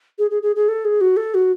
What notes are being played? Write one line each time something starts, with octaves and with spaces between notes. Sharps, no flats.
G#4
G#4
G#4
G#4
A4
G#4
F#4
A4
F#4